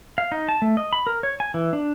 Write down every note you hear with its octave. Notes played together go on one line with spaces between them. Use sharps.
F5
D#4
A5
A3
D#5
B5
A#4
C#5
G#5
E3
D4